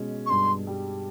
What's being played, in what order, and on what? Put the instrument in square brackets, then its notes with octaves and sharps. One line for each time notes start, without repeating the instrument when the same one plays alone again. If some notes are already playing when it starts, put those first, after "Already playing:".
Already playing: [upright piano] B2 G#3 C#4
[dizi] C#6
[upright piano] G2 [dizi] C6
[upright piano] G3